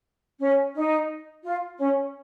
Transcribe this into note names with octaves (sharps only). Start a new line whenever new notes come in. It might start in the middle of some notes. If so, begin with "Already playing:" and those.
C#4
D#4
F4
C#4